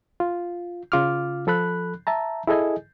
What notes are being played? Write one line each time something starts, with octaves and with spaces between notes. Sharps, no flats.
F4
C#3 F4 D6 F6
F3 A4 B5 F#6
E5 A5 A#5
E4 G#4 A4 D#5 G#5